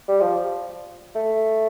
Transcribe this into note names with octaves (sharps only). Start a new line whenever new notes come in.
G3
F3
A3